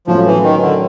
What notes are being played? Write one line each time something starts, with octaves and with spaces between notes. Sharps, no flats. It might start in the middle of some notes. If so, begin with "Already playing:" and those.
A2 F3 F#3 A3 C#4 E4
E3
D#3
D3